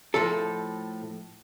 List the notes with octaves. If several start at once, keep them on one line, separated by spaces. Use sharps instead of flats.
A2 F3 A4